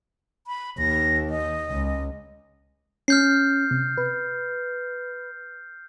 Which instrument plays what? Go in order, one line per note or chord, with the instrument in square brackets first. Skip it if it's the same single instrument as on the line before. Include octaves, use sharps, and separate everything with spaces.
[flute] B5
[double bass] D#2 [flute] A#6
[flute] D#5
[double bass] C#2
[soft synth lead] C#4 [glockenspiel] F6 G6 C7
[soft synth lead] C3
B4